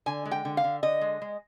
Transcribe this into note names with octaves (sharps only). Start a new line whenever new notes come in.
D3 G#5
G#3
G5
D3
F5
D3
D3 D#5
G#3
G#3